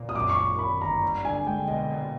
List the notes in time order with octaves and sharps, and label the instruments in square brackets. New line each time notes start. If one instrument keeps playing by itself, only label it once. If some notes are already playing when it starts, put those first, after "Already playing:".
Already playing: [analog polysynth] A#2
[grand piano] D#6
[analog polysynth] F#2 [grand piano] D6
[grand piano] C#6
[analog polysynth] G#1
[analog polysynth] F#2 [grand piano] B5
[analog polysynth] G1 [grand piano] A#5
[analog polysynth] G3
[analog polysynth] D3 [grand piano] G#5
[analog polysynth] G#3 [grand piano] G5
[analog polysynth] B2 [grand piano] D#5
[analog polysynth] A#2